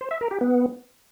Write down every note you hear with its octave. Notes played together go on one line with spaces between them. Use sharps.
C5
E5
A#4
G4
B3